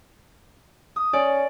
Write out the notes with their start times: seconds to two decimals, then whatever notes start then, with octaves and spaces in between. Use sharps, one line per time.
0.96 D#6
1.13 C#4 D5